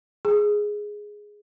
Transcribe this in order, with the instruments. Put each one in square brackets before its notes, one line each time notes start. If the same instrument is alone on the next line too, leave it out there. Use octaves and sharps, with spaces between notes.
[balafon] G#4